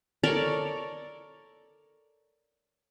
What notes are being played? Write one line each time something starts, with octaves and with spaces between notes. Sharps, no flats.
A4 A#4 C#5 D5